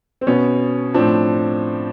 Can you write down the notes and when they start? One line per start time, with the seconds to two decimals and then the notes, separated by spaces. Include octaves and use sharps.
0.21 C4
0.27 B2 B3 C#4
0.94 A2 F3 C4 D4